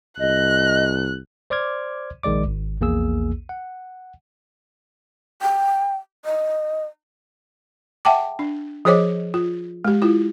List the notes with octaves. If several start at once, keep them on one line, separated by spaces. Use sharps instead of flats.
C2 D#5 F#6
C5 D5 C6 D6 F6 G#6
A#1 D#3 G#3 D5 D6
G#1
A#1 E2 A#3 G#4 E6
F#5
G5
D#5
E5 F#5 G5 A5 D6
D4
F3 G#4 C5 C#5 D#5 D6
F4
G#3 G4
E4 F4